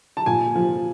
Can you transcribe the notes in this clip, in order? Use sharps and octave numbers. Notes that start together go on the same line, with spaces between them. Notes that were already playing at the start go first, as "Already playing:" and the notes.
A5
A#2 G#5
F3